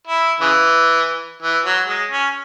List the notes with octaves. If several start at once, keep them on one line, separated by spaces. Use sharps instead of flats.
E4
C#3 E3
E3
F#3
G#3
C#4